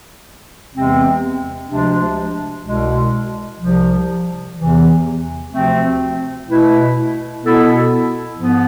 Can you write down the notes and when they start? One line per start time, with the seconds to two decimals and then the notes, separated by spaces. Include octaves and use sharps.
0.72 E2 C3 E3 G#3 C4
1.68 D2 C3 F3 G#3 D4
2.64 C2 B2 G#3
3.59 C2 C3 F3
4.56 E2 C3 E3
5.50 D2 C3 F3 A3 C4
6.46 B2 A3 E4 B4
7.42 B2 B3 E4 A4
8.37 G#2 F3 B3